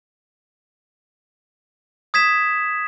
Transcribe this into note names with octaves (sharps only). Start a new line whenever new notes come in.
D#6 G#6 B6 E7